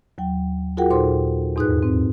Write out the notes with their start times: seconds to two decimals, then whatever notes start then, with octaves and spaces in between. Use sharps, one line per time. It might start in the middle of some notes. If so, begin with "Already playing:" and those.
0.18 D#2 F#3 G5
0.77 F4 F#4 G#4 A#4 F#5 G5
0.90 D#2 A#2 D#4 A4 C5 C6
1.56 E2 G#2 D#4 G#4 B4 F#6
1.83 G#2 C4